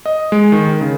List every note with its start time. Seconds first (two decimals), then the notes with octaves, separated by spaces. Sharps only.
0.06 D#5
0.32 G#3
0.52 D#3
0.67 A#4
0.81 C#3